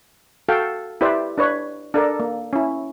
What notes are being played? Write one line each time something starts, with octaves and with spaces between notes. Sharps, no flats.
F#4 A4 F5 G5
E4 G4 B4 C5 D5 E5
D4 B4 C#5
D4 A4 A#4 D5
A#3
C#4 E4